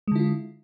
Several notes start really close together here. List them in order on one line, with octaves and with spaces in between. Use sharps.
G#3 D3 E4 F4